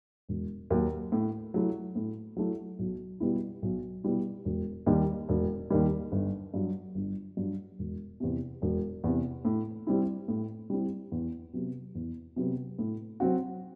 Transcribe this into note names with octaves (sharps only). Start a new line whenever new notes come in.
E1
D#2 D#3 F#3
A2
F#3 A3 E4
A2
F#3 A3 E4
B1
B2 G3 B3 E4
B1
B2 G3 B3 E4
E1
D#2 D#3 G3
E1
D#2 D#3 G3
G1
G2 F#3
G1
G2 F#3
E1
E2 C3
E1
E2 C3
A2
G3 C4 E4
A2
G3 C4 E4
E2
C3 F#3 B3
E2
C3 F#3 B3
A2
F#3 C4 F#4